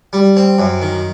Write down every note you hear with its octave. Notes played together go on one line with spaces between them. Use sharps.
G3
C4
F#2
D#3